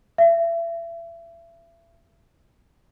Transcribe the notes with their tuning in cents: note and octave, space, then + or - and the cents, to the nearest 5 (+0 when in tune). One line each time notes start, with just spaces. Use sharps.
E5 +35